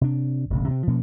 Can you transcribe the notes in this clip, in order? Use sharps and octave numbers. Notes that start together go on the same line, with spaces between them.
C3 D4
E1 A1 C#3
C3 C4
B2 F3 A#3 C#4